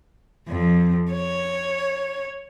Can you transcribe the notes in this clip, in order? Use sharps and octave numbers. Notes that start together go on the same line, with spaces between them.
F2
C#5